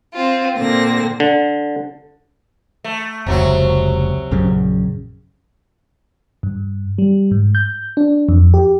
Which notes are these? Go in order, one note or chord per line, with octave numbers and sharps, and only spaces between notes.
C4 F4
A#2 D3 C4 A#6
D3
A3
F1 C#2 C3 F#3 F#4
A#1 F#2 C#3
G2
G3
G#2
G6
D4
F2
G4